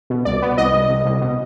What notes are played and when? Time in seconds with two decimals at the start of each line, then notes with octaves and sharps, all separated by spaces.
0.10 B2
0.25 C2 D5
0.42 B3
0.58 C2 D#5
0.74 C2
0.90 C2
1.05 C2
1.21 B2